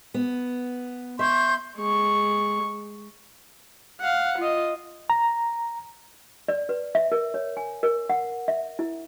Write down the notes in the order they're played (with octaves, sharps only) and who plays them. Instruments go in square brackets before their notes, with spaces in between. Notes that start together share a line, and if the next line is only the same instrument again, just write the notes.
[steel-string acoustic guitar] B3
[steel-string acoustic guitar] E5 [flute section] C6 C#6 G6
[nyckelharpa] G#3 C#6
[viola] F5 F#5
F4 D#5
[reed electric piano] A#5
[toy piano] D5
B4
E5
A#4
C#5
G#5
A#4
F#5
E5
E4